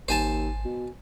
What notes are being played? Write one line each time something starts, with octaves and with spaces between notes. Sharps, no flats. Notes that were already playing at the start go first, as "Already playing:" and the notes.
G#1 D#2 C5 G#5 A5
B2